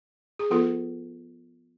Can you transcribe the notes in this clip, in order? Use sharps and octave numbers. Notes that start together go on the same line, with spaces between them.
G#4
F3 B3 F4 A4